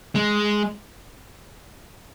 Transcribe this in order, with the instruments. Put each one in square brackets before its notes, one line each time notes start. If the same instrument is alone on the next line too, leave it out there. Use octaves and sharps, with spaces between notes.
[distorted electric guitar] G#3